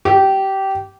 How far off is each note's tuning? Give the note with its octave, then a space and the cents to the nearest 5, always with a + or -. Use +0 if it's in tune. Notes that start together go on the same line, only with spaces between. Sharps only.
G4 -20